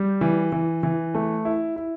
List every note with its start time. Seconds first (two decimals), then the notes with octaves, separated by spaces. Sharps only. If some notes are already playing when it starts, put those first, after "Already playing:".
Already playing: G3
0.21 E3
0.52 E3
0.83 E3
1.14 A3
1.45 E4
1.76 E4